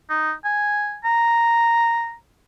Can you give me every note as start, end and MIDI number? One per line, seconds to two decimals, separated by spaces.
0.10 0.33 63
0.45 0.98 80
1.04 2.14 82